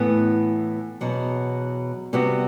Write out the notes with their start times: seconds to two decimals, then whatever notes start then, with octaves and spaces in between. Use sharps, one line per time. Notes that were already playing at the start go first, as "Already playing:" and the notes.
Already playing: A2 E3 B3
1.01 E2 B2 F#3
2.13 C3 G3 B3 F#4